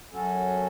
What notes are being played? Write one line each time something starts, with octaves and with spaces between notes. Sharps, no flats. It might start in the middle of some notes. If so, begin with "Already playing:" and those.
F#2 F#3 C#4 F#4 A4